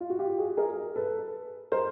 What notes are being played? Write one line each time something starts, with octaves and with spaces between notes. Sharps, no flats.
F4
F#4
F4 G4
G4
F#4 G#4
G#4 A#4
A4 B4
A#4 C5